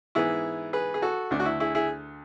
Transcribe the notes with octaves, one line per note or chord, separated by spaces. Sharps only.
G#2 E3 B3 E4 G#4
G#4 B4
G#4
F#4 A4
D2 D3 A3 D4
F#4
E4
E4 G#4
E4 G#4